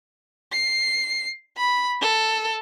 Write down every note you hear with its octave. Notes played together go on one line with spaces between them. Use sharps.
C7
B5
A4